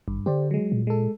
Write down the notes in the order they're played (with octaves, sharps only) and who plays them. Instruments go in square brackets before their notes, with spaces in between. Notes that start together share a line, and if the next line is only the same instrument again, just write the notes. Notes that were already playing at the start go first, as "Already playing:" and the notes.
[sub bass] G#1 [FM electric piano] G2
[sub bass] D3 [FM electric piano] G4 C5 D5
[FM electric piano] F#3 G#3
[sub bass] A#2
[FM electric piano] G#3 A4